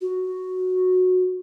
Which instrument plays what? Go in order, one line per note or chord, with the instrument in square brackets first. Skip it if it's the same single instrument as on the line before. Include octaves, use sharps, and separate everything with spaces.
[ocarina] F#4